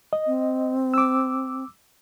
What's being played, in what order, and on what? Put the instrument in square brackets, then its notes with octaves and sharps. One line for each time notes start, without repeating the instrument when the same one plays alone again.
[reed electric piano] D#5
[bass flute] C4
[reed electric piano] D6 E6